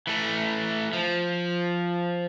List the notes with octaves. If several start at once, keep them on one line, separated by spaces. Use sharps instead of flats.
E3 A3
F3